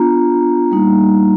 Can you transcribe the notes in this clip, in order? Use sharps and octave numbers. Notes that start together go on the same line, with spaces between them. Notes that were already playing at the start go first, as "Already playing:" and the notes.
Already playing: B3 D4 F4 A#5
G3 A#3 D#4